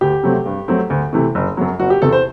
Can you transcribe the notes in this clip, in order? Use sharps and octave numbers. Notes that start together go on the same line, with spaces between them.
D2 G4
C3 F#3 A3 C4
G2
F#3 A3 C4
D2
C3 E3 A3
F#1
F#2 F#3
F#1 F#4
G4
E2 C3 A4
C5